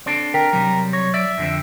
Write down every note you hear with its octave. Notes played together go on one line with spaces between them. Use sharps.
C4 D4 A4
A#4 G5 B6
C3 F#3 G3 A#4
C#5 A#6
D5 E5
F2 D3 C4